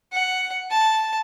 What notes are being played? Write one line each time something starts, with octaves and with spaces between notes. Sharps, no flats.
F#5
A5